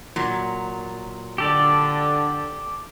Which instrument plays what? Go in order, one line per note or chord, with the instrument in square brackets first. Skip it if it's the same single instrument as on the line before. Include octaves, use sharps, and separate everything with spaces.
[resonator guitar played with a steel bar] A#2 F#3
[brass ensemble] D3 [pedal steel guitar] G4 A4 D5